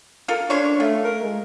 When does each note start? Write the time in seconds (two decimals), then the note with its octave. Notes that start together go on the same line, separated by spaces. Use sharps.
0.28 F4 A4 A#4
0.50 C#4 D4 C5 C#5
0.80 A3 F4
1.04 A#4
1.22 G#3